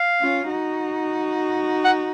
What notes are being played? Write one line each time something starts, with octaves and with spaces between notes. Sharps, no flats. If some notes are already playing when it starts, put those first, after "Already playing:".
Already playing: F5
C#4 F4
D#4 F#4
F#5